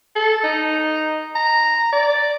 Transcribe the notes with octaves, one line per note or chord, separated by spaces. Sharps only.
A4
D#4
A#5
D5